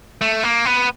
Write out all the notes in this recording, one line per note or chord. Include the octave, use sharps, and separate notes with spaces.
A3
A#3
B3